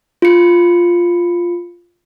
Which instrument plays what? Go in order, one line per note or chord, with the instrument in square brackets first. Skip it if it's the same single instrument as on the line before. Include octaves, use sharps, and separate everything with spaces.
[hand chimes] F4 C#7